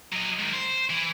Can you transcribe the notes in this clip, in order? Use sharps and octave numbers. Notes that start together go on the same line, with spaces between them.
F#3 D#5
G#2 D#3
C5
E3